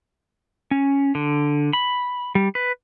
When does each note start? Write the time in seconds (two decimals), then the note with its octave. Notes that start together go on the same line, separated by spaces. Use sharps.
0.71 C#4
1.15 D3
1.73 B5
2.35 G3
2.55 B4